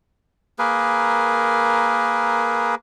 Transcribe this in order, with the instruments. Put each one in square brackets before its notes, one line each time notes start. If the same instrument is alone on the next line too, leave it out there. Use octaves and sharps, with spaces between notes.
[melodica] A#3 G#4 A#4 B4